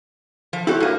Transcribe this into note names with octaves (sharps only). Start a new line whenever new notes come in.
F3
E4 F#4 G4 A4 C#5
G2 A#3